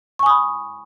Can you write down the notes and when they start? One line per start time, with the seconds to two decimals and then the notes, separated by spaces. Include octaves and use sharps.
0.19 C#6
0.23 G#5
0.26 D#6
0.29 B5